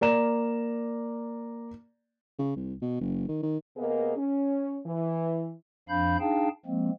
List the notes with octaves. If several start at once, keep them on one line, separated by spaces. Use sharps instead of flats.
A#3 D5 A#5 E7
C#3
C2
B2
F#1
D#3
D#3
C3 A#3 B3 G#4 A#4 D#5
C#4
E3
F2 F3 D4 F5 B5 G6
D4 D#4 G#4 F5 G5 A5
F3 G#3 A#3 C4